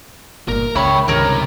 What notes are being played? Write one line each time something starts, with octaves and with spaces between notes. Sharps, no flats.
G1 A#2 A#4
C#2 C#5 E5 G5 B5 C#6
C#2 G2 C3 D#3 A#4 C#5 A#5